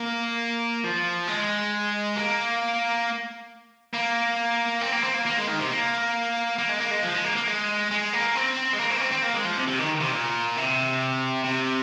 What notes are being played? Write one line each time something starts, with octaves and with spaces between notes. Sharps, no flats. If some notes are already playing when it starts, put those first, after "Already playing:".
Already playing: A#3
F3
G#3
A#3
A#3
C4
A#3
C4
A#3
A#3
G#3
D#3
C3
A#3
A#3
G#3
A#3
G#3
F3
G#3
A#3
A#3
G#3
G#3
A#3
C4
G#3
A#3
C4
A#3
C4
C4
A#3
G#3
F3
C3
C3
D#3
C3
A#2
C3
C3